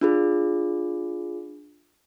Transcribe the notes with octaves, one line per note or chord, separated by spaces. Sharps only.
D4 F4 G#4